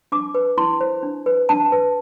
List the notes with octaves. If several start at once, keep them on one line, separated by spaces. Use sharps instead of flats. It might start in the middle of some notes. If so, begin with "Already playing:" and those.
D4 D6
B4
E4 C6
C5
D4
B4
D4 A5
B4